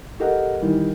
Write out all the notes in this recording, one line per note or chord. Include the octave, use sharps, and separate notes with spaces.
G4 A4 A#4 D#5 F#5
D#3 E3 G3